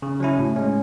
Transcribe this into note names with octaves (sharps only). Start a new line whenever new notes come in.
C#3
F#3 C#4 E4
A2
G#3 C#4